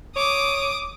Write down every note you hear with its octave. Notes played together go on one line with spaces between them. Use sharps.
C#5 D6 D#6